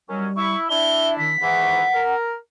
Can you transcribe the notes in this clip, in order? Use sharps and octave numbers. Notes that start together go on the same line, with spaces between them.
D#3 F#3 G3 C#4
E4 C#6
D4 E4 E5 G7
D#3 B6
G#2 D#3 E3 F#5
A#4